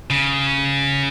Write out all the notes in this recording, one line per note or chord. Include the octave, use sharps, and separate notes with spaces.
C#3